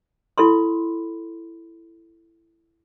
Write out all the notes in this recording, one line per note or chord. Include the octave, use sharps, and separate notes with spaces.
E4 A4 B5 C6